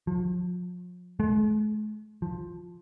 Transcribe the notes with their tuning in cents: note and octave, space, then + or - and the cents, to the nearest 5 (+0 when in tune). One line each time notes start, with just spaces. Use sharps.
F3 +40
G#3 +45
F3 +10